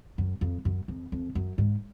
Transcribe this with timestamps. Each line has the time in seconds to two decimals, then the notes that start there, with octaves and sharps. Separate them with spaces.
0.18 F#2
0.41 F2
0.65 F#2
0.88 F2
1.12 F2
1.35 F#2
1.58 G#2